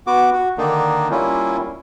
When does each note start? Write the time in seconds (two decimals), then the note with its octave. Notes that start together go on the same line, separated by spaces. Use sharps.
0.07 B3 F#4 D6
0.33 F#4
0.58 D3 D#3 A#3 D4 D#4
1.11 G3 A#3 C#4 E4 F4